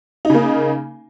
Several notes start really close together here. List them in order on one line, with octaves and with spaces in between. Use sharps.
D#4 C#3 A#3